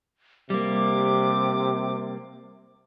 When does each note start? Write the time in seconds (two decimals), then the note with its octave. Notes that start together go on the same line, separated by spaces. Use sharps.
0.50 C3 G3 A#3 D6